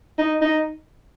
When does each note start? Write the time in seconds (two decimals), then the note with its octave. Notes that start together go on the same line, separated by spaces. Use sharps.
0.18 D#4
0.42 D#4